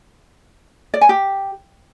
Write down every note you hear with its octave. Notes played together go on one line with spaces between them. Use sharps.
D5
G#5
G4